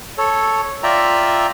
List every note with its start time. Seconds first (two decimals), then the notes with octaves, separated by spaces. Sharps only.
0.18 A4 C#5
0.83 F4 D5 E5 G5 A#5